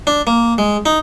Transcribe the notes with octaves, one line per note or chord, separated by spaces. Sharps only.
D4
A#3
G#3
D#4